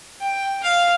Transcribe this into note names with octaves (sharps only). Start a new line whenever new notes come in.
G5
F5